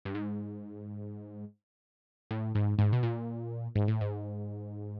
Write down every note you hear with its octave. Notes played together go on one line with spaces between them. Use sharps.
G2
G#2
A2
G#2
G#2
B2
A#2
G#2
A2
G#2